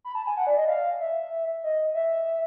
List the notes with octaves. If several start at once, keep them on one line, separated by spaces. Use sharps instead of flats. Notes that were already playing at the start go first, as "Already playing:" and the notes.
B5
A5
G#5
F#5
D5
D#5
F5
E5
D#5
E5